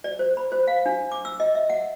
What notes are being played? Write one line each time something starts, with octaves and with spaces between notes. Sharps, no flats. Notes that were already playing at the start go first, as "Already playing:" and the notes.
D5
C5
B5
C5
F5
D4
D6
E6
D#5
E5
F#5